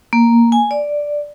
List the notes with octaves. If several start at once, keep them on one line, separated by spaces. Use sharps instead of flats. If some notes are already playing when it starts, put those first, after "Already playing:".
A#3
G#5
D5